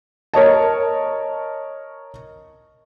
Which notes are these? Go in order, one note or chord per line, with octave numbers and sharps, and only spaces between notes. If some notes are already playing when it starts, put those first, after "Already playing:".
A#4 C#5 D#5 A5